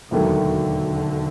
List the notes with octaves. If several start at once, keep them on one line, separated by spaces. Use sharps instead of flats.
E1 D#2 D3 D#3 F#3 A3